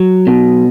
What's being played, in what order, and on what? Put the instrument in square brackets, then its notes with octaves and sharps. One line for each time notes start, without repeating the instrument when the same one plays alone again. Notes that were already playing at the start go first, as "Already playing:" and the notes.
Already playing: [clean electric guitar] F#3
B2